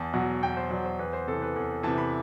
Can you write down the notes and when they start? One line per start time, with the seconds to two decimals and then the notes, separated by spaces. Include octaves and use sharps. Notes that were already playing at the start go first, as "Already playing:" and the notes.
Already playing: E2 A5
0.13 B2 F#3
0.42 E2 G5
0.57 C5
0.70 B2 F#3 D5
0.85 C5
0.99 E2 B4
1.13 C5
1.27 C3 E3 A4
1.42 B4
1.55 E2 A4
1.83 C3 E3 A5
1.98 B5